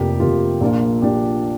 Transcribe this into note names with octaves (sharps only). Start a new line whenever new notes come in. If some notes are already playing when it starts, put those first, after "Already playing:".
Already playing: F1 F2 C3 A#3 G4
F1 F2 C3 A#3 F4
A#1 A#2 A#3 D4 F4
A#1 A#2 A#3 D4 F4 G4